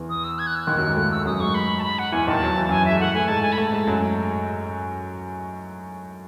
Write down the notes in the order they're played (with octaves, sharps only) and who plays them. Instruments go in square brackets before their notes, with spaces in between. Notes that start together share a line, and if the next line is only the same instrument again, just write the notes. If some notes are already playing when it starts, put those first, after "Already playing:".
Already playing: [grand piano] E2 E3
[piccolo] D#6
E6
G#6
F#6
E6
[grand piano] D#2 D#3 [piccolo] F#6
[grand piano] F#2 F#3
G#2 G#3
[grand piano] A2 A3 [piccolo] F#6
[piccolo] E6
[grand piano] F#2 F#3 [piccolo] D#6
[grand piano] G#2 G#3 [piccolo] C#6
[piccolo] B5
A5
B5
F#5
[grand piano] E2 E3 [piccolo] G#5
[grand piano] D#2 D#3 [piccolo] A5
[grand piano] F#3
E3
[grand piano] F#2 F#3 [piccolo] G#5
[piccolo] E5
[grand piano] G#3
[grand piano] A2 A3 [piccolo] F#5
[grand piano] A2 A3 [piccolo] G#5
[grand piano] G#2 G#3 [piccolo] A5
[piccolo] G#5
B5
[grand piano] A2 A3 [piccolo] A5
[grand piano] G#2 G#3
F#2 F#3